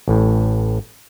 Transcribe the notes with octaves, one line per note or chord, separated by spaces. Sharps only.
A1 A2